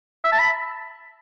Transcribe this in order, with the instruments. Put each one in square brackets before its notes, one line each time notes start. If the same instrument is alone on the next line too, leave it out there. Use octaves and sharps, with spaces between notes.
[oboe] E5
A5
B5